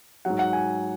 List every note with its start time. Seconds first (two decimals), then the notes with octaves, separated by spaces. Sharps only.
0.25 G#2 F#3 F#5
0.39 F#5
0.53 G#5